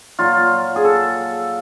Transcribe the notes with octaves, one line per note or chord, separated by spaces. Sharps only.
A#2 F#3 F4
G#4
A4